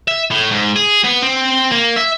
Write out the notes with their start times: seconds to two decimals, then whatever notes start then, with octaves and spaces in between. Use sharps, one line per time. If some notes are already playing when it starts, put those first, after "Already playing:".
0.08 E5
0.31 A2
0.51 G#2
0.76 G#4
1.04 B3
1.22 C4
1.72 A#3
1.96 E5